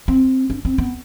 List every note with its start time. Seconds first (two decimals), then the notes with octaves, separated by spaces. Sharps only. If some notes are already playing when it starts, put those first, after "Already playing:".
0.08 C4
0.50 D4
0.65 C4
0.78 B3